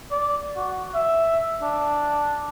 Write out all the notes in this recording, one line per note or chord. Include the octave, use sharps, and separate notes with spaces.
D5
F#4
E5
D4